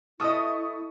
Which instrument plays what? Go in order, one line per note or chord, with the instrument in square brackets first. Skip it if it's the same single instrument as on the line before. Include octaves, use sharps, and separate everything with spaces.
[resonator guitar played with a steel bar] A3 B3 D#5 [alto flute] E4 [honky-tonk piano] C#6 D#6